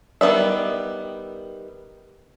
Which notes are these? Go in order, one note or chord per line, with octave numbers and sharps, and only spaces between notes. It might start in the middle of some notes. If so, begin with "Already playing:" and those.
D#3 G3 B3 D5 E5